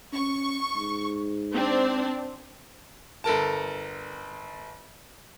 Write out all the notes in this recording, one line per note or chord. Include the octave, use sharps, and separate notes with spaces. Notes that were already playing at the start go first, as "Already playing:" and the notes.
C#4 C#6
G#2
C4 D4
G1 A4 A#4 A5